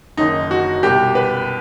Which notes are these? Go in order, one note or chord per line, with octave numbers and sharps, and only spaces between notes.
F#1 F#2 D#3 D#4
F#4
C2 B2 G4
B4